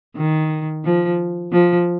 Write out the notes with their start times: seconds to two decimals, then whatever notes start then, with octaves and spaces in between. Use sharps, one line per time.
0.17 D#3
0.85 F3
1.52 F3